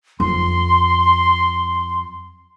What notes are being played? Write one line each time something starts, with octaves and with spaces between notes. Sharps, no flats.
F2 C6